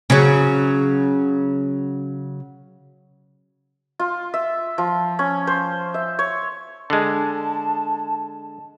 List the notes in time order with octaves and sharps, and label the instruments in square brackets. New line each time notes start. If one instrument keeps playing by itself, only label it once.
[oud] C#3 F#3
[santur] F4
E5
F3
C#4
C5
E5
C#5
[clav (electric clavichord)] D3 G#3 [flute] A5